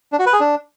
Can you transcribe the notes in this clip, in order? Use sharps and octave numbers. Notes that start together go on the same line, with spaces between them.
D4
F#4
B4
G#4
D4